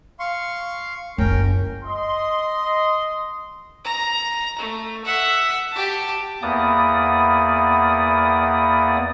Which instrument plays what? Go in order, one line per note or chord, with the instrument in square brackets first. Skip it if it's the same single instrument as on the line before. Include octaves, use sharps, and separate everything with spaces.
[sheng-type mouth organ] F5 C6 C#6
[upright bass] F#1 F4 [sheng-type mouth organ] C#4 A#4 G5
[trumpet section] D#5 C6
[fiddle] A#5
A3
E5 F#5
G4 A5
[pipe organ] E2 A#3 B3 D5 D#6